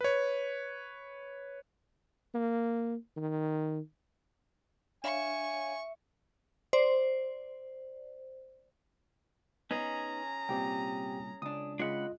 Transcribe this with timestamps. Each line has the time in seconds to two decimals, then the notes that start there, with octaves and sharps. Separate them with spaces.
0.01 B4 C#5
2.34 A#3
3.17 D#3
5.04 D4 C#5 E5 F5 G#5 C#6
6.73 C5 D5
9.71 B3 C#4 D#4 G#4 A#5
10.49 C2 A#2 C4 G4 G5
11.42 C#2 D4 D#6
11.79 C#3 G#3 D4 F4 D#5 F#5 B5